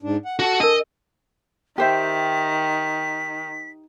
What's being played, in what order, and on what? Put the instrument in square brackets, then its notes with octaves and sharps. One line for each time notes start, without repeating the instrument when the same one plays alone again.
[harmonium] G#2 D4
F#5
[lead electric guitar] F#4 [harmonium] A4
[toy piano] D4 A#4 [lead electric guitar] D#5
[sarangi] D#3 [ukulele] G4 C5 E5 [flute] B6